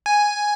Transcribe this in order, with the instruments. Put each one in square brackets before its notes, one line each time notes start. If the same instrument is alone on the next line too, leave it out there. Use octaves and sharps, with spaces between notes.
[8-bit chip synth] G#5